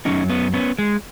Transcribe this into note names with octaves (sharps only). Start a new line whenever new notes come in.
F#2 C#3 F#3 C#4 D#4
B3 C#4
B3 C#4
G#3